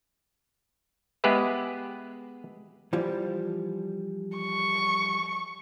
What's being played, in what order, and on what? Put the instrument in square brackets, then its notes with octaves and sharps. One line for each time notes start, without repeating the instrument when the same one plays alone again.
[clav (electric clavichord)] G#3 B3 G4 G#4 B4 E5
[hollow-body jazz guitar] E3 F3 G3
[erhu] C#6